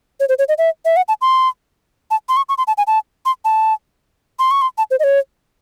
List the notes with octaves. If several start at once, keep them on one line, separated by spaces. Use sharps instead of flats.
C#5
C5
C#5
D#5
E5
E5
F#5
A5
C6
A5
C6
C#6
C#6
C6
A5
G#5
A5
C6
A5
C6
C#6
C6
A5
C5
D#5
C#5